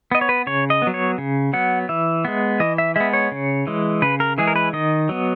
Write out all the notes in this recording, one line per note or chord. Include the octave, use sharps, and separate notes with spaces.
B3 D#5
C#5
B4
C#3 C#5
D#5
F#3 B3
C#5
C#3
F#3 B3 F#5
E3 E5
G#3 B3
E3 D#5
E5
G#3 B3 E5
C#5
C#3
E3 G#3
C#3 B4
A#4
E3 G#3 G#4
A#4
B4
D#3 D#5
F#3 B3